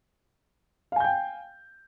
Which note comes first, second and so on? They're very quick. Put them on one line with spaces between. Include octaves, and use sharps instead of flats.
F5 G#5 G6 G5